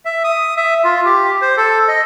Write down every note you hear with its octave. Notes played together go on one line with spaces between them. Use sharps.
E5
D#6
E5
F4
G4
C5
A4
D#5